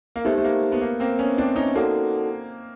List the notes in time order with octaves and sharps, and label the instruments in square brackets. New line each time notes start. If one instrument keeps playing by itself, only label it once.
[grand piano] A#3
[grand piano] A3 B3 [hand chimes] D#4 G4 C5
[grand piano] A3
A#3
B3
A#3
A#3 C4
B3 C#4
C4 D4
C#4 D#4
[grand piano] A#3 C4 [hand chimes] D#4 F#4 A4 D5 F#5